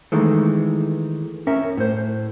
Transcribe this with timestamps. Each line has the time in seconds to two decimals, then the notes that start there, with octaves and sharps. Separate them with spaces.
0.12 D#3 E3 G#3 A3
1.47 C#4 A#4 E5
1.77 A2 C5